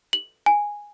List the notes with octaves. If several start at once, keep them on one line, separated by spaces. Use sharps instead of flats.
F#7
G#5